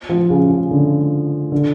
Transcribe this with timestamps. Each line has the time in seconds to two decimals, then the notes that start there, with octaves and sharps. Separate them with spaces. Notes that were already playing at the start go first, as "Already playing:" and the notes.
0.09 F3
0.30 C#3
0.51 C#3
0.71 D3
1.52 D3